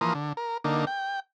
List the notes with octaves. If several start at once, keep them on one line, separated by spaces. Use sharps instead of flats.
E3 F3 A#3 A#5 C6 D#6
D3
A#4
D3 A#3 D#4
G5